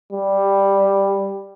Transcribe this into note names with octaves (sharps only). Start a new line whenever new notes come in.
G3